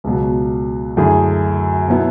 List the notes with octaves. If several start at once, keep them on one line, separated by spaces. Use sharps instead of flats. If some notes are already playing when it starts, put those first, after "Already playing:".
C#2 B2 F#3
F#2 D3 A3 E4 G#4
B2 F#3 B3 E4